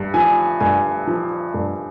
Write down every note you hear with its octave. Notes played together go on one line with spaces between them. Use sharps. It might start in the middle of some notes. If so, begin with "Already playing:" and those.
Already playing: G2
F3 G#5
G2 G#5
F3
G2